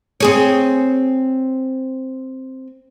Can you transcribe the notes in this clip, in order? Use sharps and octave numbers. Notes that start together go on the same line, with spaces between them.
C4 G#4 C#5